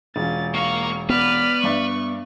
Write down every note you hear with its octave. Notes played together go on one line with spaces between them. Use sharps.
E1 C#4 F4 A6
A#3 F5 C#6
B3 B4 D5 F6
G2 D5 E5 C#6